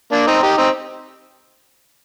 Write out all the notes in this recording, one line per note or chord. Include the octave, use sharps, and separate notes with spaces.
A#3 D4
C4 D#4
D#4 G4
C4 D#4